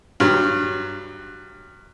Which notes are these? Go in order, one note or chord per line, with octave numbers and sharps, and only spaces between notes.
G2 F#3